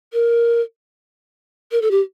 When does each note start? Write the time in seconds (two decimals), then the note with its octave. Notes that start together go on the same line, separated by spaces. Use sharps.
0.13 A#4
1.72 A#4
1.82 A4
1.91 G4